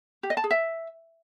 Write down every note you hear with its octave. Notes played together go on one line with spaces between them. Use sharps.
G4
D#5
A5
G#4
E5